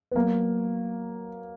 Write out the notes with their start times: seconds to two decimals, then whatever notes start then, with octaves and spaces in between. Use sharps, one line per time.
0.12 B3
0.15 F#3 A#3